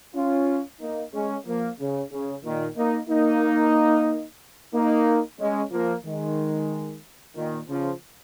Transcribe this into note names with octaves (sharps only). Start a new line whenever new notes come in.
C#4 F4
A#3 D#4
G#3 C#4
F3 A#3
C#3
C#3
A#2 D#3
A#3 D#4
A#3 D#4
A#3 D#4
G#3 C#4
F3 A#3
D#3 G#3
A#2 D#3
C#3 F3